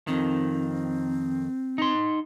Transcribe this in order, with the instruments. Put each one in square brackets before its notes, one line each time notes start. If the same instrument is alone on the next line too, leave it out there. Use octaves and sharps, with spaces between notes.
[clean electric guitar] F2 D#3 [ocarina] C4
[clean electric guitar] D#4 C6